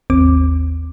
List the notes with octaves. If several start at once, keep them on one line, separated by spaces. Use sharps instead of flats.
G#1 D#2 C4 D6